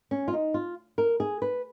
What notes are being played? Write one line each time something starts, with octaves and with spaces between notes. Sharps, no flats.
C#4
F4
D#4
F4
A#4
G#4
B4